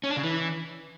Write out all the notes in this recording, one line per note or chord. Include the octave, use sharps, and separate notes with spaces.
C#4
D4
C#3
E3